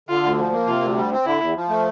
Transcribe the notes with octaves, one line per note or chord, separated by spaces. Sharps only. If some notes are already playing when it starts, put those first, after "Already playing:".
D3 F4
D2
F3
A#3
C3 F4
D2
G3
C4
D3 E4
E2
F3
A3